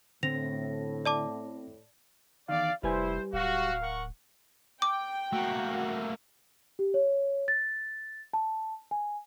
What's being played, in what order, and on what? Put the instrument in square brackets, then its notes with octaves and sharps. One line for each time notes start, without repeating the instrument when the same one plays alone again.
[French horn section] A2 [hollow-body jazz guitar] D3 [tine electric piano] C4 A#6 [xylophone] F7
[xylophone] D5 A5 D6
[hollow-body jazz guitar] E2 D#3 [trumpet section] D5 [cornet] F5
[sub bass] F1 [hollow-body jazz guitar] G3 B4 G#5 [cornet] E4 [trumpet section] C5
[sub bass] D1 [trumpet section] F#4 [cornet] F5
[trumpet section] A#4 F#5 C#6
[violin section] G5 [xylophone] D6
[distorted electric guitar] A3 A#3 [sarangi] F#4
[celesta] G4
C#5
A6
A5
G#5